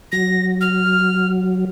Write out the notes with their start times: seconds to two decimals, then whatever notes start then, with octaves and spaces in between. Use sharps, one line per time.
0.12 F#3 A#6
0.61 F6